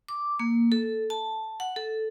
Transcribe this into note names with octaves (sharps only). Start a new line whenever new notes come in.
D6
A#3
A4
A5
F#5
A4